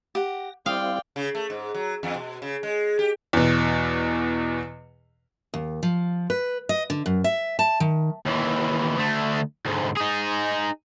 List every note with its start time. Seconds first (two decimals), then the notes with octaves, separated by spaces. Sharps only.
0.15 G4 F#5 A#6
0.66 G3 C4 E4 D5 F5 G5 D#6
1.16 C#3
1.35 A3
1.50 G#2
1.74 F#3
2.03 E2
2.14 B2
2.42 C#3
2.63 G#3
2.99 G4
3.33 E2 B2
5.54 D#2
5.83 F3
6.30 B4
6.69 D#5
6.90 D3
7.06 F#2
7.24 E5
7.59 A5
7.80 D#3
8.25 D#2 E3
8.96 D2 A3
9.65 D2 G#2
9.97 D#4 G#4